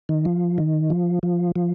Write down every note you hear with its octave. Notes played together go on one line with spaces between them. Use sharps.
D#3
F3
D#3
F3
F3
F3